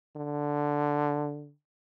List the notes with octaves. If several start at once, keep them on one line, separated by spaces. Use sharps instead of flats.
D3